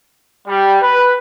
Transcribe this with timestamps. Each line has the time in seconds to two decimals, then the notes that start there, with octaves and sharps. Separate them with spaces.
0.47 G3
0.81 B4